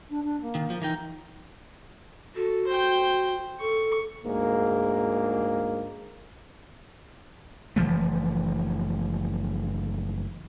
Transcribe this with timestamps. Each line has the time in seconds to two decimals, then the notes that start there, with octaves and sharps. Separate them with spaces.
0.10 D4
0.24 D4
0.42 A#3
0.55 D#3
0.70 F3
0.82 E3 D#4 A#4 G5
2.35 F#4 A4
2.67 C5 G5
3.60 A4 C#6
4.25 D2 G#2 A#3
7.76 F#1 E3 F3 A3